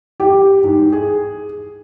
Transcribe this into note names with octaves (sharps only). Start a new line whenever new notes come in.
G4
G#2
G#4